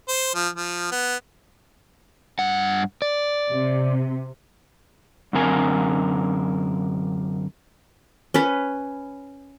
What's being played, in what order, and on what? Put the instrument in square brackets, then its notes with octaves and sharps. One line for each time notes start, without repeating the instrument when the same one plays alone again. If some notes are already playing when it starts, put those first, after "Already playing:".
[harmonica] C5
F3
F3
B3
[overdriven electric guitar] G2 F#5
D5
[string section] C3
[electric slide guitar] F#2 D3 C4 A#4 G#5
[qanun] C#4 B4